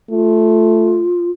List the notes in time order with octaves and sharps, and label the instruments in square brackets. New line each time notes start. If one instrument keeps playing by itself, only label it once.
[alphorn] A3 [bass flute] F4